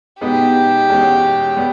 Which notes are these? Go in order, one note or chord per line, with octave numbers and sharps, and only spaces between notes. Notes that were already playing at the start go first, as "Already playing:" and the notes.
B2 G#3 B3 D#4 G4
E2 B2 G#3 C#4
G3 B3